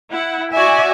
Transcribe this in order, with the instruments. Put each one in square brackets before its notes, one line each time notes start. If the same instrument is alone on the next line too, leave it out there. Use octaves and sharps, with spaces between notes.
[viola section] E4 F#5
[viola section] F#4 D5 G#5 [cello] E5